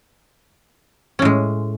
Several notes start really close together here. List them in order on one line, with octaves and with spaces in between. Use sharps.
C#4 A2 G#3